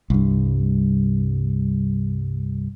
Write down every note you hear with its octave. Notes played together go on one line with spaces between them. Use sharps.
C2 G2